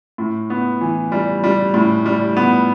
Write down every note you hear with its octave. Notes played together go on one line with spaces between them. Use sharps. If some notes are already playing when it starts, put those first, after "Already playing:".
A2
B3
E3
G3
G3
A2
G3
B3